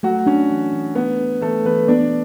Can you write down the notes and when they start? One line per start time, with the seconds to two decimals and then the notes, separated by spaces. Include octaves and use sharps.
0.03 F#3 A3 F#4
0.26 C#4 D4
0.50 E3
0.73 E3
0.95 A3 B3
1.19 D4
1.41 E3 A3 A4
1.65 E3 B3 B4
1.88 B3 D4 D5